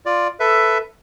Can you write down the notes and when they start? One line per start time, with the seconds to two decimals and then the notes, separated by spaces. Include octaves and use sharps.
0.06 F4 D5
0.40 A4 B4 E5